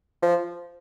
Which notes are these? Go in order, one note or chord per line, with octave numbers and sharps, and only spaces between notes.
F3